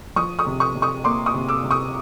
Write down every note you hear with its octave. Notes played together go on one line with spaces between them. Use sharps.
F3 C#6 D#6
C#6 D#6
C3
C#6 D#6
C3
C#6 D#6
A#3 C6 D6
C#6 D#6
C3
D6 E6
C3
C#6 D#6